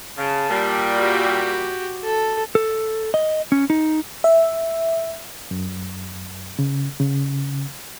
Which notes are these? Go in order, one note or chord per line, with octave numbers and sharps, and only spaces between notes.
C#3 A5
A#2 G3
F#4 G4
A4
A4
D#5
C#4
D#4
E5
F#2
C#3
C#3